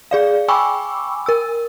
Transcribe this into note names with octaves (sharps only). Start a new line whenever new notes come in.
G#4 D5 F5
G5 G#5 B5 C#6 D6 E6
A#4 E6